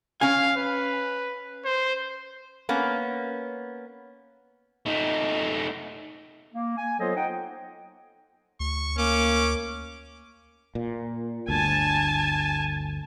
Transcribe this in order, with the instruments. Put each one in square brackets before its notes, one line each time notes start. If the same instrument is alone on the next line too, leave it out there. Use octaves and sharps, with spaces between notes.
[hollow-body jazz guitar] C#4 G#5 [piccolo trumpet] F5
[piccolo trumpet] B4
C5
[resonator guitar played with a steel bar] A#3 B3 C#4
[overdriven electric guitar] A3 D#4
[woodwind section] A#3
G#5
F#3 B3 F4 A4 C5 D#5
D#4 D#5 F#5 G5
[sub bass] D2 [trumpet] C#6
[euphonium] A#3 [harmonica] C#4 [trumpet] D6
[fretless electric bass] A#2
[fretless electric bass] G1 D2 [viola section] G#5 A5